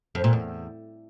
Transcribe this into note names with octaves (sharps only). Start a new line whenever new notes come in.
F2
A#2
E2